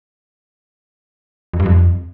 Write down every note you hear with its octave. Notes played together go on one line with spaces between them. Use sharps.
F2
G2
F2